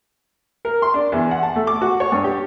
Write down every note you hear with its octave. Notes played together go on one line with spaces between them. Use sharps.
A#4
C6
D4
E2
F#5
A5
A3
D6
F#4
C#5
G2
G4